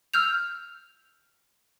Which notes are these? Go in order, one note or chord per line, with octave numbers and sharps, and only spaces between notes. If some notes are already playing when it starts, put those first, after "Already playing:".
E6 F6 G6 F7